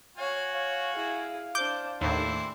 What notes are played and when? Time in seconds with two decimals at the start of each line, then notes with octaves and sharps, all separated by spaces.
0.17 F#4 C#5 F5 G#5
0.52 C#5 F5
0.95 E4 G#4
1.55 D4 C5 D6 G6
2.01 D#2 A2 E3 C4 D4 E4